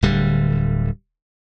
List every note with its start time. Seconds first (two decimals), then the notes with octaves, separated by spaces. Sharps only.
0.02 D1 D3 G3